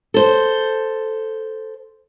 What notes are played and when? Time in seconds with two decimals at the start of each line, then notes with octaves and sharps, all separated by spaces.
0.14 A4 C5